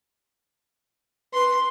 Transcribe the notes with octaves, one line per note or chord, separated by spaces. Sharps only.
B4 C6